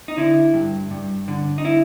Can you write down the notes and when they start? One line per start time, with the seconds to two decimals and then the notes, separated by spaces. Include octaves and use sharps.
0.08 D#4
0.17 D3 E4
0.54 G2
0.91 G2
1.28 D3
1.58 D#4
1.65 E4